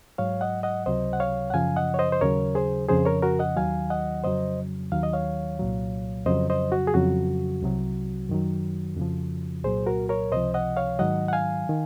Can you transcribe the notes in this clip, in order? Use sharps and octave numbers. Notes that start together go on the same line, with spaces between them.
G#2 F#3 C#5 F5
D#5 F#5
D#5 F#5
C#2 C3 F#3 C5 D#5
F#5
C#5 F5
F#5
F#2 C#3 F3 F5 G#5
D#5 F#5
C#5
C5 D#5
C5
D#2 C#3 F#3 A#4 C#5
G#4 C5
F2 C#3 F3 G#4 C5
A#4 C#5
F#4 A#4
D#5 F#5
D#2 D#3 F#3 F5 G#5
D#5 F#5
F2 C#3 F#3 C5 D#5
D#2 D#3 F#3 F5
D#5
C#5 F5
C2 A#2 F#3
F2 C#3 F#3 C5 D#5
C5 D#5
F#4
G#4
F2 C#3 F#3 F#4
C2 C3 F#3
F#2 D#3 F#3
F2 C#3 F3
C2 A#2 F#3 G#4 C5
F#4 A#4
A#4 C#5
C#2 C3 F3 C5 D#5
D#5 F#5
C#5 F5
G#2 D#3 F#3 D#5 F#5
F#5
F5 G#5
D#3